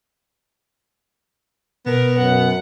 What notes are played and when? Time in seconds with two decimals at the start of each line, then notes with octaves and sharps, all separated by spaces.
1.86 B2 B3 A#4
2.18 F#2 F#5